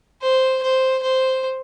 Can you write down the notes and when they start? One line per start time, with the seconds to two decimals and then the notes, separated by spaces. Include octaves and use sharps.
0.22 C5
0.63 C5
1.03 C5